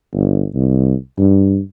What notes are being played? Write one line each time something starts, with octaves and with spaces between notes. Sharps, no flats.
G1
C2
G2